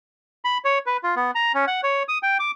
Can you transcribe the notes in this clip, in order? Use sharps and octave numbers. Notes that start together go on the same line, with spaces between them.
B5
C#5
B4
F4
B3
A#5
C#4
F#5
C#5
D#6
G5
D6